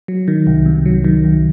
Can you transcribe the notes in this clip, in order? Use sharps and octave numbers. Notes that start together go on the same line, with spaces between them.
F#3
D#3
C2
C3
F#3
D#3
C2